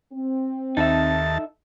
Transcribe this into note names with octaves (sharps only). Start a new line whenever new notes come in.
C4
D#2 D#4 A4 E5 A5